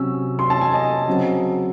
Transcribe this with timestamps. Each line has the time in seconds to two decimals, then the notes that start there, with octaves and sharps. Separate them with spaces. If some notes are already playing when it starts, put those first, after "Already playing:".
Already playing: C3 F#3 C#4 E6
0.39 C6
0.50 A5
0.61 G#5
0.74 D#5
1.08 C#3 F#3 C4